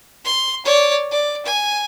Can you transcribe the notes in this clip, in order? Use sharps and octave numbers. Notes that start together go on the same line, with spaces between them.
C6
C#5 D5
D5
G#5